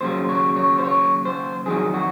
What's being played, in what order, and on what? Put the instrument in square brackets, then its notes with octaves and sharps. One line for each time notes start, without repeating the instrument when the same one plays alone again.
[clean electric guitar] D#2 C#3 F#3 C5
C#5
C#5
C5
C#5
C5
F2 D#3 F#3 G#4
F#4